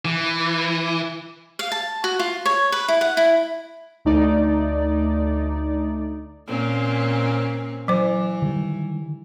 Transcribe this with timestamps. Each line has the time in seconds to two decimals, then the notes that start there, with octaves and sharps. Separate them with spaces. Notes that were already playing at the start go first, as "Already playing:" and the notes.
0.05 E3
1.59 F5
1.72 A5
2.04 F#4
2.19 F4
2.45 C#5
2.72 B4
2.88 E4
3.01 F#5
3.17 E4
4.05 D2 A3 D#4 D5
6.47 A#2 C4 C#4
7.88 E3 F#3 C5
8.42 D3 D#3 G3